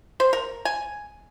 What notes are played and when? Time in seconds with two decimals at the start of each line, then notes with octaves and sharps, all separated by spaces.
0.20 C5
0.33 A#4
0.65 G#5